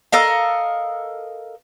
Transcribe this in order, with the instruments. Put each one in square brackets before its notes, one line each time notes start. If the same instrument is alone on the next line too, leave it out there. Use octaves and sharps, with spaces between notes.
[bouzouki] A4 A#4 D#5 F5